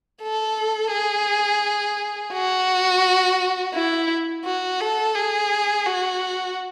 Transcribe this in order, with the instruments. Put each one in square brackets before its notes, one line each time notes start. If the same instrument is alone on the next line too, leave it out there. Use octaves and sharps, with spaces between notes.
[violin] A4
G#4
F#4
E4
F#4
A4
G#4
F#4